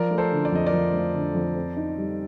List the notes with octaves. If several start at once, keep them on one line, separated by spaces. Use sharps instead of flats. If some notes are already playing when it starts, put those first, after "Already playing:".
Already playing: F3 A#4 D5
A3
A4 C5
D3
D5
F2 D#5
A#4 D5
F3
A3
D3
F2
C4
D#4
G3